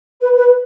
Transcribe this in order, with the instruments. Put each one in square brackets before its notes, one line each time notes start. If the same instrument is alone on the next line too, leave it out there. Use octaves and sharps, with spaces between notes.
[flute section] B4
B4